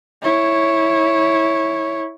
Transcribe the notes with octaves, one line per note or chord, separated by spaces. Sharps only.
E4 C#5